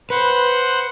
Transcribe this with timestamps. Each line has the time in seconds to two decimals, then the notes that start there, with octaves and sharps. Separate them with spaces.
0.10 B4 C5 F#5